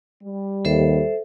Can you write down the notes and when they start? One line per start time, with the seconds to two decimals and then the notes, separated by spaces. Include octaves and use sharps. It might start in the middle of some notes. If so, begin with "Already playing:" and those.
0.22 G3
0.65 D#2 A4 C5 E5